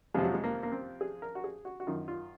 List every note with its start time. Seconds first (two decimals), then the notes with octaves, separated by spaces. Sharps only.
0.14 F2 C3 F3 G#3
0.24 F#3
0.34 G#3
0.44 A#3
0.63 A#3
0.72 C4
1.01 G#4
1.22 A#4
1.35 F#4
1.44 G#4
1.65 F#4
1.80 F#4
1.87 F#2 D#3 F4
2.08 F4